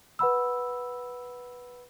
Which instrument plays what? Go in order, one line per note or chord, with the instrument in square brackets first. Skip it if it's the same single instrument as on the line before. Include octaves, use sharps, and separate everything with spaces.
[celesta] B4 F#5 B5 E6